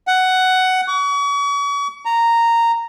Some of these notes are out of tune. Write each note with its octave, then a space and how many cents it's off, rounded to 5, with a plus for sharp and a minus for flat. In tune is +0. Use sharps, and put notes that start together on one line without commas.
F#5 +10
C#6 +40
A#5 -10